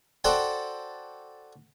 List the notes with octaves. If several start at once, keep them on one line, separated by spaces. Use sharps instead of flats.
F#4 A4 C5 D5 F#5 G5